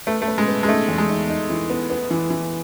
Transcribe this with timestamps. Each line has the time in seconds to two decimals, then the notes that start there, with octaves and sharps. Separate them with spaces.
0.07 A3 B4
0.22 A3
0.28 B4
0.38 G#3
0.48 B3
0.63 G#3
0.68 A3 D#4
0.89 E2
0.98 G#3
1.09 D#4
1.30 D#4
1.50 E3
1.70 B3
1.90 B3
2.11 E3
2.30 E3